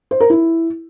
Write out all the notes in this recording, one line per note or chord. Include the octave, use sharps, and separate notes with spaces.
C5
A#4
E4